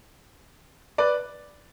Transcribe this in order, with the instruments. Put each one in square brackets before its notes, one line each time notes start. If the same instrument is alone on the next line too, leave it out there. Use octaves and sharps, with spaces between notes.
[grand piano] B4 D5